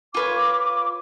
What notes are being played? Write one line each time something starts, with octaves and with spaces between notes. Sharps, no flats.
F4 B4 C#5 D6